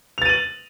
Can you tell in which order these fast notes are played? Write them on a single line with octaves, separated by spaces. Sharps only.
F7 A6 D#7 F#7